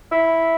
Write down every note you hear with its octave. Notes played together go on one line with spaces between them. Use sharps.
E4